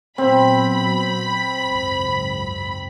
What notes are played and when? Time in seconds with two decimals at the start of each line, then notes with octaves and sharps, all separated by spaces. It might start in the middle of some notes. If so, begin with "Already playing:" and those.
0.18 A#2 F#3 B3 C4 B5
1.61 G#1 C#2 F#2